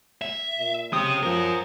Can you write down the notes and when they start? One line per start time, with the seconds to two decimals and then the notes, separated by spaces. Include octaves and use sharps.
0.22 E5
0.59 A#2
0.93 C#3 C4 G4 D#6
1.23 F#2 F3 A#4